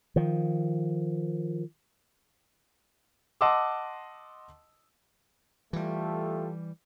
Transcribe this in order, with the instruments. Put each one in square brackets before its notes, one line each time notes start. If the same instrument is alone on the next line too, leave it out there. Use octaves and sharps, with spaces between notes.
[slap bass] D#3 F3
[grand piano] D#5 F#5 A5 C6 D6 E6
[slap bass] E3 G3 [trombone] A3 [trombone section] F4 G4 A4